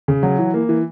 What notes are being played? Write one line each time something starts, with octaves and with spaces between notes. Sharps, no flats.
C#3
F#3
E3
A#3
E3